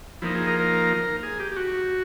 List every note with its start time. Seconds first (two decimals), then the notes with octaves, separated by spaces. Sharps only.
0.22 F3 A#3 D#4 E4
0.35 G#4
0.47 A#4
0.60 A#4
1.23 G#4
1.40 G4
1.52 G4
1.56 F#4